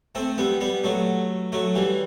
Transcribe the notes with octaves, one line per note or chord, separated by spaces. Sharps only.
A3 C4
G3 B3
G3 B3
F#3 A3
F#3 A3
E3 G3